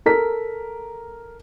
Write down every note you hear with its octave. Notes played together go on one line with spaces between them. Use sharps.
A4 A#4 B6